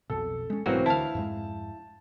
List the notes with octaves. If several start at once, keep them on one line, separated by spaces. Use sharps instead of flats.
B1 F2 B2 A4
G#3 C#4
B1 G#2 E3 F#3 A3 A#3 C4 F#4
D2 D3 E4 F5 A5
F2 G#2 G#3